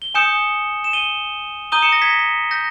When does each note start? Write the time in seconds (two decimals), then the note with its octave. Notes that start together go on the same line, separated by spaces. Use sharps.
0.02 G7
0.15 G#5 D#6 G6 C#7 E7
0.84 E7
0.93 D#7 G7
1.72 A#5 D#6 G6 D#7 G7
1.82 C#7 E7
1.92 A#6 C#7
2.02 G#6 B6
2.51 G6 A#6